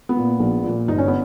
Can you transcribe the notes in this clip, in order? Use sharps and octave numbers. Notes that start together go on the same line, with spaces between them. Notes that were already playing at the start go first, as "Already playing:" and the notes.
B3
A#2 A#3
A#1
A#2 A#3
G1 D#4
C#4
B3